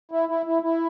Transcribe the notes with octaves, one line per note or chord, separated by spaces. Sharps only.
E4
E4
E4
E4